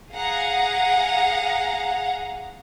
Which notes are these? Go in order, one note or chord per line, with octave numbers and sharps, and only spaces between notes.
G#4 F5 F#5 A#5